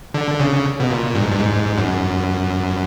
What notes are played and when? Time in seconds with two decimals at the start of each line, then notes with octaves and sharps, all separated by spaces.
0.14 D3
0.40 C#3
0.80 B2
0.90 A#2
1.15 G2
1.23 G#2
1.31 G2
1.40 G#2
1.78 F#2